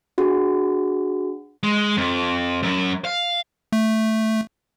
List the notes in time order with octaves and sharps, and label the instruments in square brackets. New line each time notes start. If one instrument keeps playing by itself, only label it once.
[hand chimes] D4 F#4 G#4
[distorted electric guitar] G#3
F2
F#2
F5
[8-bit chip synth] A3